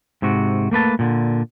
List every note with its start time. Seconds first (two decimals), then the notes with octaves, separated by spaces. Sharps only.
0.22 G#2 C3 F#4
0.71 A3 A#3 B4 A5
0.99 A#2 D3